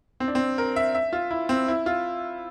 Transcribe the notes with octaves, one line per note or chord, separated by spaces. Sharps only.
C4
D4
C4
A#4
E5
E5
F4
E4
C4
E4
F4